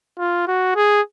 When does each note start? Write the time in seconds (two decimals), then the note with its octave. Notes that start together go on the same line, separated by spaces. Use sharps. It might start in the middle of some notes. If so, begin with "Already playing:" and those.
0.19 F4
0.47 F#4
0.75 G#4